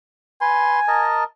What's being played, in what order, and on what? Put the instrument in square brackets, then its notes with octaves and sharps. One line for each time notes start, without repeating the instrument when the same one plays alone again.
[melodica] B4 C6 [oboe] G#5
[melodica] A#4 D#5 A5